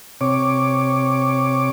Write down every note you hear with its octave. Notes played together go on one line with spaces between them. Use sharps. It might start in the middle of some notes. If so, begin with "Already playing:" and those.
C3 C#5 D6